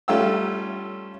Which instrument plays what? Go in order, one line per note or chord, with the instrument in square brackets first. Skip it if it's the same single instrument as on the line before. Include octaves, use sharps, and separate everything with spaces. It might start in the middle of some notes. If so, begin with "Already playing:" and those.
[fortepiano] G3 A3 C#4 F4 G5 E6